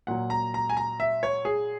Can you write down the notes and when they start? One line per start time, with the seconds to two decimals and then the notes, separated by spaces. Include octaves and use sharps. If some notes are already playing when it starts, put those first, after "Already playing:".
0.07 A#2 F#3 F#5
0.30 A#5
0.54 A#5
0.69 G#5
0.77 A#5
1.00 E5
1.23 C#5
1.45 G#4